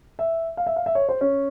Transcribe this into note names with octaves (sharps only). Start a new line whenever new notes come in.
E5
F5
E5
F5
E5
C#5
C5
C#4